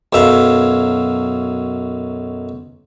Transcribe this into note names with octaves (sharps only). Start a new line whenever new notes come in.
B1 F#2 E5 F5